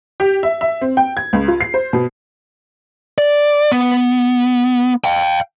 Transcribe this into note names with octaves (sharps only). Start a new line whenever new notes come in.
G4
E5
E5
C4
G5
G#6
C#2
F4
C7
C5
B2
D5
B3
F5 G5